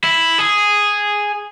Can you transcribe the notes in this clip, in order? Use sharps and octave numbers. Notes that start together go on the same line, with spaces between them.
E4
G#4